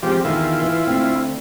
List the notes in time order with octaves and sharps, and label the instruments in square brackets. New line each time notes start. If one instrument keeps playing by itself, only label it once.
[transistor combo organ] F3 G4 [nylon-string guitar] G#3 C4
[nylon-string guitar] E2 D#3 [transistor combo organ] E4 F4
[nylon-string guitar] E3
D2 C4